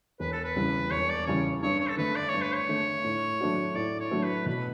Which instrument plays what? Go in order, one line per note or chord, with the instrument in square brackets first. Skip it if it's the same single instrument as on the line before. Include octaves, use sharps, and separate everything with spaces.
[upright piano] E1 [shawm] B4
[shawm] A4
B4
[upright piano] E2 C#3 G3
[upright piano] E1 [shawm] C#5
[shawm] D5
[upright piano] E2 C#3 G3 [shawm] C#5
[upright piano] G2 [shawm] C#5
[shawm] C#5
A4
[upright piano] D3 A3 [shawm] B4
[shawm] D5
C#5
[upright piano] G2
[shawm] B4
C#5
[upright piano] D3 A3
A2
F#3 A3 D4 F#4
[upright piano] A2 [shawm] D5
[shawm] C#5
[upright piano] F#3 A3 D4 F#4
[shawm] B4
[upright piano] B2 [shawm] B4